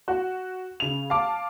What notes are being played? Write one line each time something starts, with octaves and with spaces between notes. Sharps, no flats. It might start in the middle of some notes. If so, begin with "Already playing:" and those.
F#4
C#3 F7
F5 A5 D6